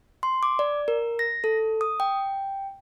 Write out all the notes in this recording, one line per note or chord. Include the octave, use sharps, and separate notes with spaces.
C6
D6
D5
A#4
A#6
A4
D#6
G5